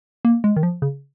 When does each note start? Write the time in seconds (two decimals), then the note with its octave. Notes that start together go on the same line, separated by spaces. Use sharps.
0.25 A#3
0.44 G#3
0.57 D#3
0.63 F3
0.82 C#3